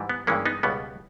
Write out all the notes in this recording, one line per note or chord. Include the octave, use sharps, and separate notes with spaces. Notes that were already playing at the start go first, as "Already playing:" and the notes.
Already playing: G#2 E3 G3
B3
G2 E3 G#3 A#3 C#4
B3 D#4
C#2 B2 G3 B3